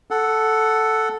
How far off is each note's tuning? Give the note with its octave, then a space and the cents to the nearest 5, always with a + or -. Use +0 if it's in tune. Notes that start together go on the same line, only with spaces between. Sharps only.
A4 +0 F#5 +0